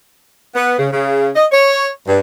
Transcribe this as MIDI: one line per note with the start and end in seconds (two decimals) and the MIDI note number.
0.55 0.77 59
0.79 0.88 49
0.92 1.30 49
1.35 1.45 75
1.52 1.90 73
2.07 2.19 43